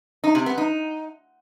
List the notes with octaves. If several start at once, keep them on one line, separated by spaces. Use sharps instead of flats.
D#4
C3
B3
D#4